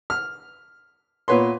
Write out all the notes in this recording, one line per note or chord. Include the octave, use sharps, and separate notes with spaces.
F6
A#2 B3 B4 C#5 C6